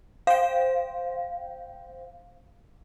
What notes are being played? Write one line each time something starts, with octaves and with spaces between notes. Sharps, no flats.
C5 F5 G5